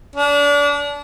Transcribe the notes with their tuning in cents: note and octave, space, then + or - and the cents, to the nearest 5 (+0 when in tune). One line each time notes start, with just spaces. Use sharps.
D4 -30